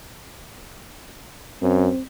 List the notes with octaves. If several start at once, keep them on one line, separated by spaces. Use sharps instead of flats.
F#2 C4